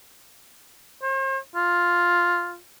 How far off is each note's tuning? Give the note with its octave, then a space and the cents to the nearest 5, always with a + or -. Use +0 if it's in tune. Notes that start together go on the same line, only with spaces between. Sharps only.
C5 +40
F4 +0